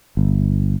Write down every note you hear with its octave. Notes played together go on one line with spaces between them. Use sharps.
G1